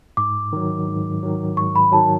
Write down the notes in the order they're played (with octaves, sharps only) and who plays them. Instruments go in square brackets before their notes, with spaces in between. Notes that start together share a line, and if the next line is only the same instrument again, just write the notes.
[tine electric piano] G#2 [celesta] D6
[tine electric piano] D#3 F#3
G#2
D#3 F#3
[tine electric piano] G#2 [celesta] C#6
[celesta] B5
[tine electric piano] D#3 F#3 [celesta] A5